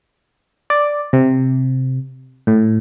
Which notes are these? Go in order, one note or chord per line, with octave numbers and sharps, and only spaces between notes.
D5
C3
A2